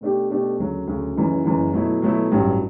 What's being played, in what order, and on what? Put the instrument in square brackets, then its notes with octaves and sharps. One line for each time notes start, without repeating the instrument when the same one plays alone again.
[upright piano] B2 A3 D4 G4
B2 A3 D4 G4
D2 C#3 F#3
D2 C#3 F#3
F#1 F#2 E3
F#1 F#2 E3
B2 F#3 A3 E4
B2 F#3 A3 E4
A1 G2 F#3